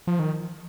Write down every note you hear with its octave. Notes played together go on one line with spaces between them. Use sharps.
F3
D#3